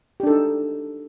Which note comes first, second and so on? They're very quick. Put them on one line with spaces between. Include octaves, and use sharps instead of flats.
G4 D4 A4 D#4